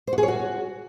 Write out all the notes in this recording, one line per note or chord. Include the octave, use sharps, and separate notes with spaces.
C5
F#4
G#4
C#5
F#4